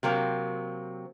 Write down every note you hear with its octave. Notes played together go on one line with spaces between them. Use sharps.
C3 F#3 A#3 C4